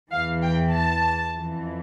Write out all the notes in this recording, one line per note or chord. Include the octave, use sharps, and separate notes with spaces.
E2 E3 F5
G5
A5
F2 E3